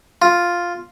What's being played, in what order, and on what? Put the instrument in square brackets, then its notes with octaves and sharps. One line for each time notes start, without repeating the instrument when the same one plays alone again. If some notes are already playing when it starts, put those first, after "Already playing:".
[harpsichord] F4